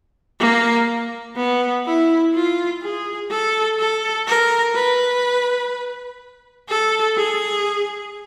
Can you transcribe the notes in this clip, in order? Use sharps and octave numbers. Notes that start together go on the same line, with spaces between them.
A#3
B3
E4
F4
G#4
A4
A4
A#4
B4
A4
G#4